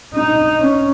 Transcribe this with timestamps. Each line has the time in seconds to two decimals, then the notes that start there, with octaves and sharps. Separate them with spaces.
0.14 D#4
0.60 C#4